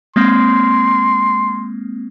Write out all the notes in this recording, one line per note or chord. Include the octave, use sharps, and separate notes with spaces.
G#3 A#3 C4 C6